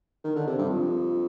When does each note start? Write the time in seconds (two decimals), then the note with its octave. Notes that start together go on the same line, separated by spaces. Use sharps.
0.24 D#3
0.36 D3
0.47 C3
0.58 G2
0.69 F2